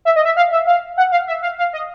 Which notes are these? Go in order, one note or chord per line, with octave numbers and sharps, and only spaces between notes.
E5
D#5
E5
F5
E5
F5
F#5
F5
E5
F5
F5
D#5